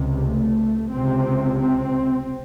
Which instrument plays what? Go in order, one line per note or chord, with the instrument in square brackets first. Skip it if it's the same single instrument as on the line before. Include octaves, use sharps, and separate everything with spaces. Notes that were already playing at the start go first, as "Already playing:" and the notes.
Already playing: [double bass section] C#2 C3
A3
C#2 C3 C4
C4